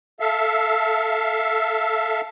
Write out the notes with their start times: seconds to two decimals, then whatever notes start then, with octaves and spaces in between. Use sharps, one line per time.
0.20 A4 E5 F5